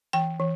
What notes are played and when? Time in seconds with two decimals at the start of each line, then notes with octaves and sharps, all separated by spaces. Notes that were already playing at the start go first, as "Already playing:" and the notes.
0.13 E3 G5
0.40 E3